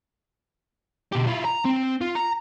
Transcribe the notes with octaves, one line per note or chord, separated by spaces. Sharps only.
B2 G4
E4 F4
A#5
C4
F4
A#5